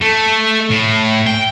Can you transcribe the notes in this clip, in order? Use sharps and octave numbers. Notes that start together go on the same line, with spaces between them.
A3
A2
G5